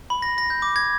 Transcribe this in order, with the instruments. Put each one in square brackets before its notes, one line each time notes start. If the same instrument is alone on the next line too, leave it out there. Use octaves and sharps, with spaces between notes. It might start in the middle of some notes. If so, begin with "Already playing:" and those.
[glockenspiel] B5
A#6
A#6
G6
D6
G#6